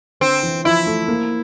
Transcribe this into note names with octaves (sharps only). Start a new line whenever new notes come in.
D3 C4
E3
F3 E4
A3
A#3